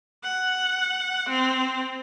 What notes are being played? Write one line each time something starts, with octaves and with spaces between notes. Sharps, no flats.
F#5
C4